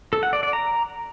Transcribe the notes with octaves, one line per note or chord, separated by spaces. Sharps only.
A4
F#5
D5
D5
A#5